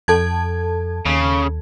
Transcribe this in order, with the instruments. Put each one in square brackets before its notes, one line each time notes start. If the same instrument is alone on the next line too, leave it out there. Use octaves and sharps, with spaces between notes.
[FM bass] F2 [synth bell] A4 A5 G#6
[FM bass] D#2 [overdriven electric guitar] C#3